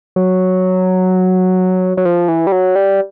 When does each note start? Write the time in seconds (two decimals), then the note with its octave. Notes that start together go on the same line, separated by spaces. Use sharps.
0.16 F#3
1.97 F#3
2.05 F3
2.28 E3
2.47 G3
2.52 F#3
2.76 G3